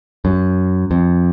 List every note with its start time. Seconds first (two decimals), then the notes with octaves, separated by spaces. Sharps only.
0.25 F#2
0.91 F2